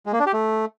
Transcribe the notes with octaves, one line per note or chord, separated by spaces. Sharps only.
G#3
A#3
D4
G4
A3